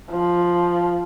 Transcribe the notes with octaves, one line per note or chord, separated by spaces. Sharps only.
F3